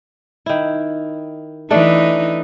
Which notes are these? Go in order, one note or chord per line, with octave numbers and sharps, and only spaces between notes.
D#3 E4
E3 A3 D4 D#4 A4